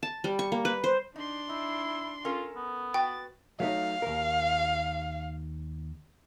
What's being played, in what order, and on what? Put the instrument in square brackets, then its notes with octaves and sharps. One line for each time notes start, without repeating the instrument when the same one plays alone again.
[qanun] A5
G3
C#6
A#3
B4
C5
[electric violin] D4 C6 [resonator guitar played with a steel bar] D#4
[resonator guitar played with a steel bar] D#4 [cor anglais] E4
[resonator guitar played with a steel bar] C#4 A4 A#4 [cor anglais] F4
[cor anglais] B3
[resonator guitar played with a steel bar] F#4 B4 [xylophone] G5 [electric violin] A6
[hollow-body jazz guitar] F#3 A3 D#4 [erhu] F5
[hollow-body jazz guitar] D#2 A#4